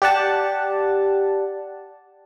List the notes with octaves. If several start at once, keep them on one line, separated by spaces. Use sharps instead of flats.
G4 D5 F#5 A5